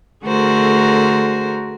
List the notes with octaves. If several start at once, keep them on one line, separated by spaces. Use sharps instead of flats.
D3 A3 F#4 G#4 A#4 C5